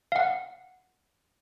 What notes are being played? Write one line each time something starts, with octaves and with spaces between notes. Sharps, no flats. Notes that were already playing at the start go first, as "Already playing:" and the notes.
F5 F#5